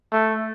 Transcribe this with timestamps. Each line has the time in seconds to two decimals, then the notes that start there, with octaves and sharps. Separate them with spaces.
0.12 A3